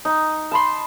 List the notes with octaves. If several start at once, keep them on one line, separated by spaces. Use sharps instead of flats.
D#4
A5 B5 C6